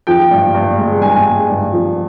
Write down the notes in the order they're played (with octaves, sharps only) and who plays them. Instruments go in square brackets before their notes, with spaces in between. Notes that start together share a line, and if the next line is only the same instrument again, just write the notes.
[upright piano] F3 G5
G2
G2
G#3
G2 G#5
G#3
G2
F3